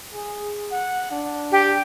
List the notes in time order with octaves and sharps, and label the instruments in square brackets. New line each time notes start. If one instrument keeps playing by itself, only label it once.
[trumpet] G#4
F#5
D4
[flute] G4